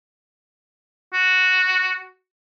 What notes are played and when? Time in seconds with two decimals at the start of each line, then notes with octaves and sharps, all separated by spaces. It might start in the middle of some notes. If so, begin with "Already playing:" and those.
1.13 F#4